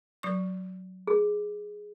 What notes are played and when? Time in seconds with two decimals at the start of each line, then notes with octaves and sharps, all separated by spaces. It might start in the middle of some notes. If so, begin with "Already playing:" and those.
0.23 F#3 C#6
1.07 G#4